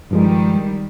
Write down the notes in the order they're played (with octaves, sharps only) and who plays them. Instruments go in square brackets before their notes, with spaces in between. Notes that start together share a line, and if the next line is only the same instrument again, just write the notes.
[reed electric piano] G2 F3 G#3 [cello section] D#3 G3